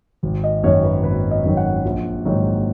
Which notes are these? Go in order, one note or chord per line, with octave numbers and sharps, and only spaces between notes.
G#1
D#5
F#2 D#3 F#3 C#5
B4
G#1 B4
D#5
F#2 D#3 F#3
F#5
A#1
G#2 D#3 F#3